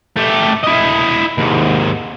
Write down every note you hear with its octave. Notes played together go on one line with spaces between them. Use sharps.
A3 G4
E4 D#5
D#2 G#2